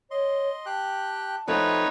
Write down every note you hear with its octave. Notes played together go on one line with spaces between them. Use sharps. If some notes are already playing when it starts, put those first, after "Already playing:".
C#5 D#5 C6
G4 G5 A5 F#6
F3 A3 C4 D#4 B4 C#5 F#5